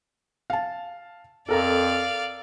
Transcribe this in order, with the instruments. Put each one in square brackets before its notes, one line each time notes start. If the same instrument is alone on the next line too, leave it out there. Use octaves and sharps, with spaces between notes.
[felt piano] F5 A5
[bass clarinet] F2 [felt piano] A4 A#4 A#5 [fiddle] D5 F5